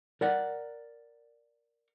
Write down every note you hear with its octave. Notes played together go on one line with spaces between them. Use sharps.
A#4 D5 F#5